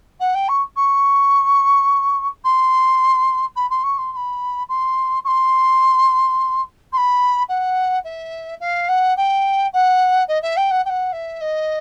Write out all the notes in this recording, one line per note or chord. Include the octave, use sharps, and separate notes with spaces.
F#5
G5
C#6
C#6
C6
B5
C6
C#6
C6
C6
B5
C6
C#6
C6
C6
B5
F#5
E5
F5
F#5
G5
F#5
D#5
E5
G5
F#5
G5
F#5
E5
D#5